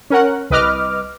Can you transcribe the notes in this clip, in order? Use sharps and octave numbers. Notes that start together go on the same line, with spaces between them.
C#4 A#4 F#5
C2 B4 D#5 D6 F6